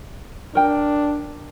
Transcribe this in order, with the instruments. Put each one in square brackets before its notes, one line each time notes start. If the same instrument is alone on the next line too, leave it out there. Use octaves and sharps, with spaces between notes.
[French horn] D4 [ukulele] A#4 G5